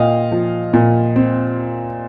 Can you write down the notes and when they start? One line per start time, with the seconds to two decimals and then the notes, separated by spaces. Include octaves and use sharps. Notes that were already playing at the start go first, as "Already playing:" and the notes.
Already playing: A#2 D#5 F5 G5
0.32 F3
0.73 A#2
1.16 C4